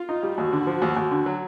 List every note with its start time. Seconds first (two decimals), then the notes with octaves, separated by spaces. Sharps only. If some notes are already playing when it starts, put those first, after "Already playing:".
Already playing: F4
0.09 D#4
0.23 G3
0.38 D#2 F#4
0.53 D3
0.67 F3
0.82 D#2
0.96 D#2
1.11 D3
1.26 F#3